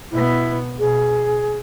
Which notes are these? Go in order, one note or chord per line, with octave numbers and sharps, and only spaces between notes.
B2 B3 E4
B2 G#4